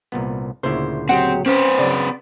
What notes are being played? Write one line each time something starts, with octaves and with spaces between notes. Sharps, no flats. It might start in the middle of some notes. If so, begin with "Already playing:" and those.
C2 A#2 B3
D2 A#2 C#3 E4 C5
F#3 C4 G4 G#4 F#5
C4 C#4 B4 C5
C#3 F#3 D5